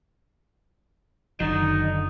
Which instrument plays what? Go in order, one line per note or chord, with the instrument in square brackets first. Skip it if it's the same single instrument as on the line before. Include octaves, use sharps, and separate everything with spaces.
[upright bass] F#1 [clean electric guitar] D3 D#3 F#3 [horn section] D#4